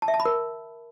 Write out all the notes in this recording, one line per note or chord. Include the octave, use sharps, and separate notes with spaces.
A5
E5
A5
B5
A#4